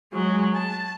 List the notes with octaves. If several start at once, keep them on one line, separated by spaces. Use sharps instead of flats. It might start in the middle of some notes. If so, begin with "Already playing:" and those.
F#3 G#3
A5